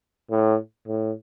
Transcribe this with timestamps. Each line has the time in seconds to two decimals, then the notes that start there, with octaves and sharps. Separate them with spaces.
0.30 A2
0.88 A2